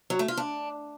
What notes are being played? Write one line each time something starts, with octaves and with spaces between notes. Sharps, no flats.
F#3
A3
F4
D4